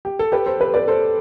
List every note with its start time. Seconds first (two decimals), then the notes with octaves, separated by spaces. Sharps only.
0.05 G4
0.19 A4
0.32 G4 B4
0.46 A4 C5
0.60 G4 B4
0.74 B4 D5
0.88 A4 C5